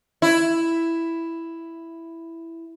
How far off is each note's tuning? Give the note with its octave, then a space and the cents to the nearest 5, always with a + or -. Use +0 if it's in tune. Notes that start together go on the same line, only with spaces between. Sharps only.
E4 +5